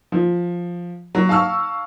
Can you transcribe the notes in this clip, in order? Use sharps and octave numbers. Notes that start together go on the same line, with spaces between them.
F3
F#3
F5 A5 C#6 E6 F6